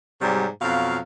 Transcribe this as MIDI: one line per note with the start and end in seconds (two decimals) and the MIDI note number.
0.21 0.46 44
0.21 0.46 48
0.21 0.46 54
0.21 0.46 55
0.61 0.98 41
0.61 0.98 47
0.61 0.98 54
0.61 0.98 77